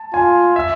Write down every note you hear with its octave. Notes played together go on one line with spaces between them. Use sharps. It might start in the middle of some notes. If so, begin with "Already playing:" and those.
Already playing: A5
F4 G#5
E5